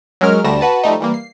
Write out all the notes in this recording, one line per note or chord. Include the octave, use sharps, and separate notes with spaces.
F#3 G#3 C#4 A#4 F6
D2 D3 G3 A3 A#6 E7
F#4 B4 A5
F3 G3 A3 D#4
E3 G3 A#3
C7